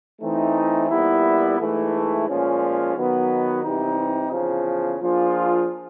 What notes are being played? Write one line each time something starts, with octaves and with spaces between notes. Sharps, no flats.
E3 A3 C4 D#4
A#2 G3 B3 E4
G#2 E3 A3
A#2 F3 G#3 C#4
D#3 F#3 B3 D#4
C3 E3 G3 C4 D#4
E2 C#3 F3
F3 A#3 D4 F4 G#4